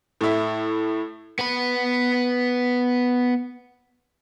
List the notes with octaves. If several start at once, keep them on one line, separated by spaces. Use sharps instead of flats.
A2 E4
B3 B5